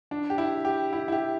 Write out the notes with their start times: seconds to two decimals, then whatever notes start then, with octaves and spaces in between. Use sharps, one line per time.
0.11 D4
0.30 G4
0.38 E4
0.65 G4
0.93 E4
1.08 E4
1.12 G4